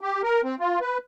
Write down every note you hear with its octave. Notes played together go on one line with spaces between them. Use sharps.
G4
A#4
C4
F4
B4